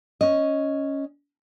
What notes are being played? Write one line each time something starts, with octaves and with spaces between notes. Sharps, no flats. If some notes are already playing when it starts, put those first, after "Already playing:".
C#4 D#5